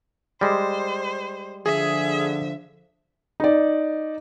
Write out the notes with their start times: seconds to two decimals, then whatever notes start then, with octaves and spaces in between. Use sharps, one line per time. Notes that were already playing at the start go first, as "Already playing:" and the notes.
0.41 G3 G#3 C5
1.66 D3 F3 G#4 E5
3.40 D#4 D5